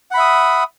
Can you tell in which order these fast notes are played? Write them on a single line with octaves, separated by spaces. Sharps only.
F#5 B5 E5 D#6